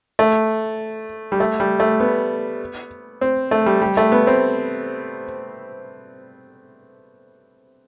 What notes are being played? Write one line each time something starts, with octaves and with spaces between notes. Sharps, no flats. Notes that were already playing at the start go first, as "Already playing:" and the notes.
A3
G3
A3
G3
A3
B3
C4
A3
G3
G3
A3
B3
C4